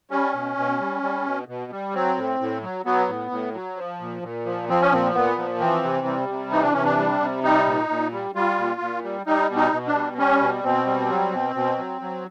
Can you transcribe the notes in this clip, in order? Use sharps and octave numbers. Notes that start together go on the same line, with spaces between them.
G3 C#4
B2
B2
G3
G3
B2
B2
G3
F#3 C4
A2
A2
F#3
F#3 B3
A2
A2
F#3
F3
A#2
A#2
F3
F3 C4
C#4
A#2 C4
A#2 B3
F3
E3 C4
C3
G3
C3
E3 D#4
D4
C3 C#4
D4
G3
C3
G3 D#4
A#2
A#2
G3
G3 F4
A#2
A#2
G3
G3 D#4
B2
D#4
B2
D4
G3
G3 C#4
B2
B2 C4
G3
F#3
B2
B2
F#3
F#3